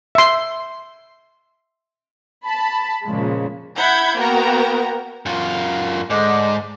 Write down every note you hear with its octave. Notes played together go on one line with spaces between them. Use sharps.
E5 C6
A5 B5
A#2 C#3 F3 G#3
E4 F#5 B5 G6 G#6
A#3 B3 F#4 A#4 G5 A#5
F#2 F4
G#2 D3 D#5 D6